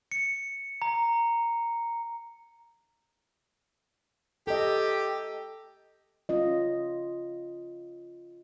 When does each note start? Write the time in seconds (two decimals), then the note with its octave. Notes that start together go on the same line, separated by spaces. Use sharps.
0.12 C#7
0.82 A#5
4.47 G4 A4 D#5
6.29 C#4 F4 D#5